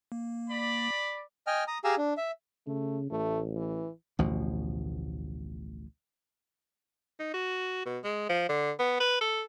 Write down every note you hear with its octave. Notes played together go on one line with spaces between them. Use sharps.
A#3
D5 B5
D#5 G5 G#5 F6
A#5 D#6
G4 G#4 F5 G#5 A#5 E6
D4
E5
C#3 A3
A1 A3
E3
A1 D2 B2 F3
D#4
F#4
B2
G#3
F3
D3
B3
B4
A4